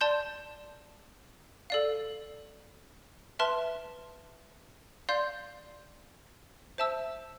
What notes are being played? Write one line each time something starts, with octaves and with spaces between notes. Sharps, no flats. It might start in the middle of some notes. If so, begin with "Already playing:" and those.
D5 A5 C6 G6
A4 D5 F5
B4 E5 A5 C6 F6
D5 F5 C6 G6
C5 E5 A5 E6